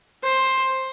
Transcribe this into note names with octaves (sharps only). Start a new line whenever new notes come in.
C5